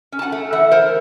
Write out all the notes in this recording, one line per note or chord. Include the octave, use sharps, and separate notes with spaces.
C#4
A5
F#5 G#5
A3
E3 E5 F#5
A3 A#4 C5